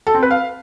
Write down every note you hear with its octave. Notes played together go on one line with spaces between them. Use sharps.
A4
C4
B4
F5